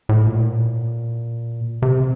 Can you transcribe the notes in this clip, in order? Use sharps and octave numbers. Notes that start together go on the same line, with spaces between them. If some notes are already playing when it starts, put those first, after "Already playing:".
A2
A#2
C3